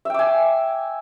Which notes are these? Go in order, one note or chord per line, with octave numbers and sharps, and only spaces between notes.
E5 G5 G#5 D6